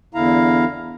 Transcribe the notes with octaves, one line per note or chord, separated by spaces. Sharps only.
E2 D3 E4 F5 A#5